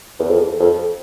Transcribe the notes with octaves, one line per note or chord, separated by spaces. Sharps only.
E2
F2
F2